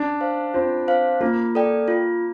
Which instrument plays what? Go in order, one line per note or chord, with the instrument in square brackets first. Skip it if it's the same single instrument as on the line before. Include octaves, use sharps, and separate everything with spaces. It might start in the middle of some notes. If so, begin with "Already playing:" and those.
Already playing: [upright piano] D4
[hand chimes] C5 F5
[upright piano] C4 [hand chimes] F4
[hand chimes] C5 F5
[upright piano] A#3 [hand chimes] F4
[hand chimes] A4 D5 G5
F4